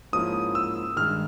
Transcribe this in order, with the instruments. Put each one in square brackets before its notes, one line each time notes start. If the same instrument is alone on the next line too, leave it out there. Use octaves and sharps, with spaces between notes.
[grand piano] G#2 F3 A#3 C#4 E4 [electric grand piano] D#6
[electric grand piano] E6
[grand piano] G2 D#3 G#3 [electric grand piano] F6